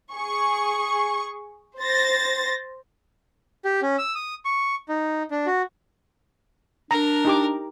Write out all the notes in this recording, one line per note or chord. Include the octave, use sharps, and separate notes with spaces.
G#4 C#6
C5 A6 A#6
G4
C#4
E6
D#6
C#6
D#4
D4
F#4
D4 A#4 A#5
D#4 G4 D6